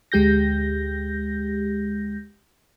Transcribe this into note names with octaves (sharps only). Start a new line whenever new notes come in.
D2 G#3 G4 G6 A#6